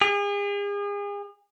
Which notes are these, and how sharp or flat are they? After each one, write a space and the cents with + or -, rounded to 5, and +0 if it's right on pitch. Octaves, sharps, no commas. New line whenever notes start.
G#4 -40